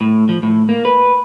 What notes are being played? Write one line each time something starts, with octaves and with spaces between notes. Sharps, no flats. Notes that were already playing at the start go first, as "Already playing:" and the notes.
A2
F3
A2
A#3
B4